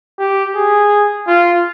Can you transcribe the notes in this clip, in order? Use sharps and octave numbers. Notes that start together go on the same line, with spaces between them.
G4
G#4
F4